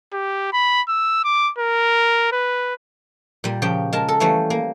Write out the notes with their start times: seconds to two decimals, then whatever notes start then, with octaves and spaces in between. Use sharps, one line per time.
0.14 G4
0.53 B5
0.88 E6
1.24 D6
1.58 A#4
2.32 B4
3.44 A#2 G3
3.62 C#3 F3 G4 G5
3.93 G#3 A#4 A5
4.08 A4
4.20 E3 G3 A3 A#3 C#4
4.50 A#3